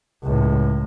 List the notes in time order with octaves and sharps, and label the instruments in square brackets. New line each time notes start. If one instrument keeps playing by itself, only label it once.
[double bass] C#2 A2